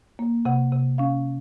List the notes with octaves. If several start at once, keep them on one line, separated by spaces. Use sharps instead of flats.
A#3
C3 F#5
C3
C#4 F5